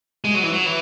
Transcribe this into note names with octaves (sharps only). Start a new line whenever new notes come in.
G#3
F#3
E3
F#3
E3